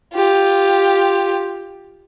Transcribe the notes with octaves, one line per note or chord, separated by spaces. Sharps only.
F4 G4